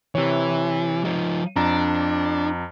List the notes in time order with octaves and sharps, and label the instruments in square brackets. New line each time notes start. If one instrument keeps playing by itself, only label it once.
[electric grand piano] C3 C#5 [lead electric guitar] E3
[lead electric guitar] F3 D#4
[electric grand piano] F2 A#5 [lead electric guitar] D4